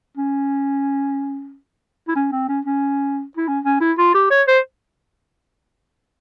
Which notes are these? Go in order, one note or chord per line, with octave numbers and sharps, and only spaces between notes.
C#4
E4
C#4
C4
C#4
C#4
E4
C#4
C#4
E4
F4
G4
C#5
C5